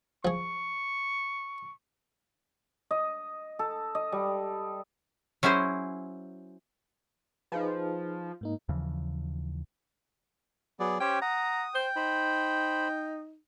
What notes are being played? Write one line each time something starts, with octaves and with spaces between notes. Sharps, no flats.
F3 G#4 C#6
D#5
A4
D#5
G3
F#3 C#4 E4 G#4 C5
F3 D#4 G#4 B4
G#2 A#3 D#4
D#2 C#3 E3 F3
F#3 B3 G#4 D5
C#4 G4 C5 C#5 G5
F#5 A#5 D#6
C5 G5
D#4 C5 B5